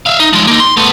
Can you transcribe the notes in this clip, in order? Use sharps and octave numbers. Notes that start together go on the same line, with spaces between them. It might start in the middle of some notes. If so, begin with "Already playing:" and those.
E5 F5
D#4
F3 G#3
A#3 D#4
C6
A3 B3